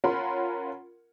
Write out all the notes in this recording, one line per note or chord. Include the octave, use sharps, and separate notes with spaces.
C#4 F4 A#4 F#5 B5 C6